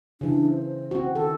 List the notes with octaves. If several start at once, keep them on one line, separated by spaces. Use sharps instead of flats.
C#3 E3 D4
C5
C4 F#4
D#3 A4